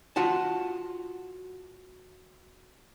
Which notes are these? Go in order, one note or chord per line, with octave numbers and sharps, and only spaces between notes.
F4 F#4 F#5 A5